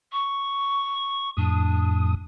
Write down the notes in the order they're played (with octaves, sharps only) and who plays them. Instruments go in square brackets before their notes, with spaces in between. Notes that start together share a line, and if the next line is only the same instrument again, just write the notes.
[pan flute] C#6
[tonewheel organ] F2 A2 D#6 [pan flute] D4